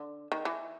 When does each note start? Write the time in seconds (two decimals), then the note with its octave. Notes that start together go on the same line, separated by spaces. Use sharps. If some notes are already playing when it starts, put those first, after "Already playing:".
Already playing: D3
0.32 D#3
0.45 E3